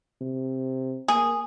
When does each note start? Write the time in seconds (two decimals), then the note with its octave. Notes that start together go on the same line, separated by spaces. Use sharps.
0.21 C3
1.08 A#3 G#4